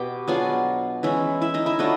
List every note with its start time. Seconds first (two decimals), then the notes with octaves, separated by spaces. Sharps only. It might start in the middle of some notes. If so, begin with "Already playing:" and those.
Already playing: B2 B3 G4 G5
0.28 F#3 B3 D4 F4 G#4 G#5
1.03 E3 G#3 C#4 E4
1.42 E4 E5
1.54 D#4 D#5
1.66 E4 E5
1.79 F#3 A3 D4 D#4 F4 D#5